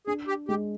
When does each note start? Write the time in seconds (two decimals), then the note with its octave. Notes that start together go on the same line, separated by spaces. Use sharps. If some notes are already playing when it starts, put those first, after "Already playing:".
0.07 D4 G#4
0.27 G4
0.48 G#3 G4